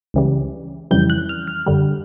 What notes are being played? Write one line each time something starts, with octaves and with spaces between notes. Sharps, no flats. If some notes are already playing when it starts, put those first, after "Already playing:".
C#2 C#3 E3 G3
F2 C#3 E3 G3 G6
F#6
F6
F6
F#2 D3 G3